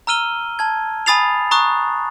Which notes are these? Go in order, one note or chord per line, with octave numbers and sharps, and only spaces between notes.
A#5 E6 F6 D#7 G7
A5 G#6
G#5 B5 D#6 A6 C7 F7
A#5 C#6 D#6 F#6